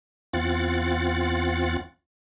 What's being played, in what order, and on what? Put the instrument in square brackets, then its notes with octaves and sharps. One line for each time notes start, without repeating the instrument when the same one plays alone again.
[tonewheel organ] E2 C4 F4 F#5 A6